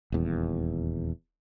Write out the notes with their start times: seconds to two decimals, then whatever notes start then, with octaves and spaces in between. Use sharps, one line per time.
0.12 D#1 E2